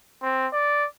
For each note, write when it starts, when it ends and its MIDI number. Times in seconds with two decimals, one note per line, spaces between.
0.22 0.47 60
0.53 0.86 74